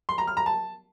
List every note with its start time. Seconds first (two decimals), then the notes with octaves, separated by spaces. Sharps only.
0.09 C6
0.18 A#5
0.27 F6
0.37 A#5
0.46 A5